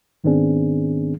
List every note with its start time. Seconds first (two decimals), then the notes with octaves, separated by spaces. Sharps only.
0.24 G#2 D#3 B3 C4 D4 G#4